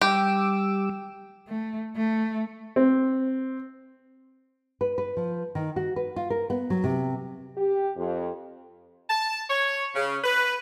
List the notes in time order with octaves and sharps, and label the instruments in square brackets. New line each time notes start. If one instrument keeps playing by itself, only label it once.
[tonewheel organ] G3 D6 E6 [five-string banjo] G4
[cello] A3
A3
[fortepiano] C4
[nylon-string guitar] B4
B4
F3
D#3
F#4
B4
F4
A#4
B3
F#3
C3
[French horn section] G4
F2
[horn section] A5
C#5
C#3
B4